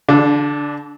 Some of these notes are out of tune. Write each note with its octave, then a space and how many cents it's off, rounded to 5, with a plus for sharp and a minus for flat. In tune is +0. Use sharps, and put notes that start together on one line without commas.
D3 -35 D4 +0